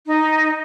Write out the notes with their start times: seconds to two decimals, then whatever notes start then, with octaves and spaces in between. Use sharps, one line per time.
0.07 D#4